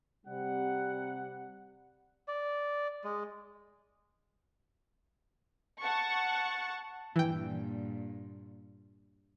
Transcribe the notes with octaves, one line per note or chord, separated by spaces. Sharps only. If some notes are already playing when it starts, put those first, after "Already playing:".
C3 G3 F#5
D5
G#3
F#5 A5 C#6
G2 A#2 E3 G5